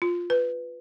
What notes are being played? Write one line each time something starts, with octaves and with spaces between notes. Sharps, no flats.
F4
B4